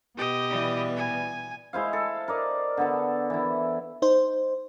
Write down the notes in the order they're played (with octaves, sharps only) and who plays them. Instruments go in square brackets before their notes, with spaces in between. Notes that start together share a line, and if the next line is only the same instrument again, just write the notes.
[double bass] B2 B3 [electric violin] G4 D#5
[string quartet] E3 G3
[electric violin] G#5
[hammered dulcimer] G#3 E4 C5 F5
A4
A#4 D5 D#5
D3 B3 A4
E3 E4
[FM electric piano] D#4 C5